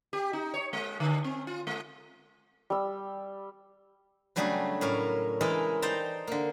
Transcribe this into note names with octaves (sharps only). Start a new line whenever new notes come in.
G4
D#4
C#5
G#3
D3
C4
F4
G#3
G3 E6
C#3 F#3 G3 A3 D4 G#4
A2 C#4 A#4
E3 G#3 E4 A#4 D#5 A5
D#4 C5 D5 G5 A5 A#5
D3 A#3